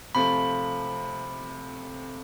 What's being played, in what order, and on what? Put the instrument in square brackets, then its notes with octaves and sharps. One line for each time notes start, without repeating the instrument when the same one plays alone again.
[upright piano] C3 F3 A3 [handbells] B5